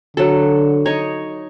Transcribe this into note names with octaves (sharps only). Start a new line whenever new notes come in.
D3 F#3 A4
D#4 C#5